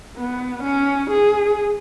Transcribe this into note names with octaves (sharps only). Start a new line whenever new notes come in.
B3
C#4
G#4